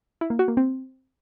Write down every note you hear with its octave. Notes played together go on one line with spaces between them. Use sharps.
E4
A#3
F#4
A#3
C4